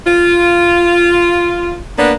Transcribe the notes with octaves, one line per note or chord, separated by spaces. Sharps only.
F4
A#3 B3 D4